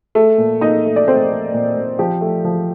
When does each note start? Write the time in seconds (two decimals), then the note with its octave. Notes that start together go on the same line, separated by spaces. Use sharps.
0.15 A3 A4
0.38 A#2
0.61 A#2 D#4 D#5
0.85 A3
0.96 D5
1.07 A3 C4 C5
1.31 A3
1.54 A#2
1.76 A#2
1.99 F3 G4
2.21 A3
2.44 F3